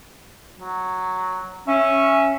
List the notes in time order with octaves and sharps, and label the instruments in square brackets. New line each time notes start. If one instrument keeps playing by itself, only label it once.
[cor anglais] F#3
[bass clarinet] C#4 [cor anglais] E5